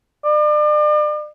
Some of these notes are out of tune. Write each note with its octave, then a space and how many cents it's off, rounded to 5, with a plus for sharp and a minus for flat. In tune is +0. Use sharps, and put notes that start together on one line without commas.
D5 +35